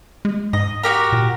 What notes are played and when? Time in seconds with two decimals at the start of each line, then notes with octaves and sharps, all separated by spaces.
0.25 G#3
0.53 G#2 D#5
0.83 F#4 G4 A#4
1.13 A#2